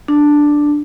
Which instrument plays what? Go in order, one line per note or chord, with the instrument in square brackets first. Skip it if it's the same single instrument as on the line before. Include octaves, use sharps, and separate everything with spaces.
[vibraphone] D4